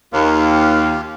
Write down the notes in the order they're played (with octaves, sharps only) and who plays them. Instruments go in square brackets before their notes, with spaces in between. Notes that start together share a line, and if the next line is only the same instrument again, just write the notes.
[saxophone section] D#2 [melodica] F4 G4 F5